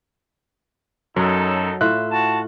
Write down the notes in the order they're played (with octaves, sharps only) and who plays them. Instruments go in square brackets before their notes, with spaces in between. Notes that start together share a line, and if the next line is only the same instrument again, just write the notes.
[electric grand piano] F#2 [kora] F#3 [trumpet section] D#4 A4
[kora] A2 F4 E5 [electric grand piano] F#6
[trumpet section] F#4 A5